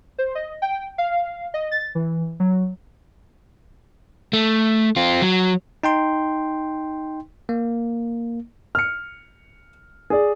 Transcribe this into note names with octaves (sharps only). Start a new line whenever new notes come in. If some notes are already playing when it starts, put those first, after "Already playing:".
C5
D#5
G5
F5
D#5
A6
E3
F#3
A3
C4 F4
F#3
D#4 G5 C6
A#3
F6 C#7
G#4 D5